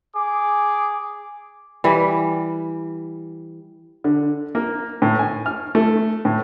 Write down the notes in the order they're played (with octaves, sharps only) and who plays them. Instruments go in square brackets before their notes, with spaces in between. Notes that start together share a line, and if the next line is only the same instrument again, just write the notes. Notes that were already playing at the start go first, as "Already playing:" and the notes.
[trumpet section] G#4 D6
[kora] E3 G3
[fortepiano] D3
A#3
A2
G#5
F6
A3
A2